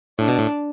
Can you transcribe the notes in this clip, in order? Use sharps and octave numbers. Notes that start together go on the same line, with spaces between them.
A2 D4
B2
A2